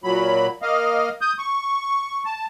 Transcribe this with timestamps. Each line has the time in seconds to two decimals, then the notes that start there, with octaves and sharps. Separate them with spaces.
0.04 A#2 F#3 B5
0.62 A#3 D#5 F5
1.21 D#6 G6
1.39 C#6
2.25 A5